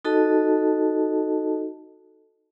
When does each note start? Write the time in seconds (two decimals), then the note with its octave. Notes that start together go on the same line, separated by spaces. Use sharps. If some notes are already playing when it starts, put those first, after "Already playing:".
0.05 D#4 F#4 A4 D#5 A5